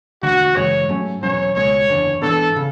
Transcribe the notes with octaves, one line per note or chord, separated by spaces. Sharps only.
E1 D2 D3 F#4
F#2 C#3 E3 G#3 C#5
G#2 F#3 A3 C#4
E2 B2 F#3 C#4 C#5
C#2 B2 G#3 C#5
F#1 E2 D3
G#2 E3 B3 D4 A4
C#3